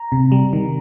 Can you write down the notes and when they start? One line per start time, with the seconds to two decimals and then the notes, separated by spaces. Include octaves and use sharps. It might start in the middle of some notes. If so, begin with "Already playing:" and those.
Already playing: A#5
0.12 C3
0.32 G3
0.53 D#3